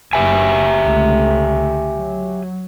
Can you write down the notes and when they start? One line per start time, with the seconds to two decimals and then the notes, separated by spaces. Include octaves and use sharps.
0.13 F#1 G4 E5 G#5
0.81 C#2 D3 A3
1.96 F#3